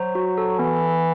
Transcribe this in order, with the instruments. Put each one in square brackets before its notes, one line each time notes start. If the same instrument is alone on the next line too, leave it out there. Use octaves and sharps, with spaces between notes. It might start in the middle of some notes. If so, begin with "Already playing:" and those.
Already playing: [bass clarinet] F#3 [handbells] C5
[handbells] F#4
A4
[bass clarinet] E3 [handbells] B3
[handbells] B3